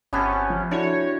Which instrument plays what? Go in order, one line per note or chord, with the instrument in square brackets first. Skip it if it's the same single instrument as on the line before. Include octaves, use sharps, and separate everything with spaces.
[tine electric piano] G1 A5 [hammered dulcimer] C3 B3 G4 [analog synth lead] C#4
[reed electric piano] F3
[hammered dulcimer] D3 [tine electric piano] D4 E4 F#4 [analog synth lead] C#5